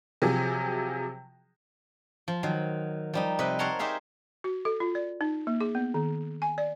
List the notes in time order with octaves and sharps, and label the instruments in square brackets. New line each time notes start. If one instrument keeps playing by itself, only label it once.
[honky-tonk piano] C3 F3 F#3 G#4
[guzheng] F3
D#3 F#3
F3 G3 D#4
C3 B4 D#5 B5
A#4 C#5 F#5 A5 A#5 C6
D#4 G4 G#4 C5 E5 F5
[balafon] F#4
A4
F4
D5
D#4
A#3
G#4
B3
D#3
G#5
D5